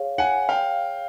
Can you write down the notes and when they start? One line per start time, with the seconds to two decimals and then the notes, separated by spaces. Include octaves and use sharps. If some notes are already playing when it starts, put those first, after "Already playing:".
Already playing: G#4 C#5 F5
0.18 F#5 G#5
0.49 F5 G5